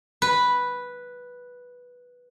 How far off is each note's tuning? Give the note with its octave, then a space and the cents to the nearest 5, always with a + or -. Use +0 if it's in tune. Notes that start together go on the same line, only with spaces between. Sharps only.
B4 -5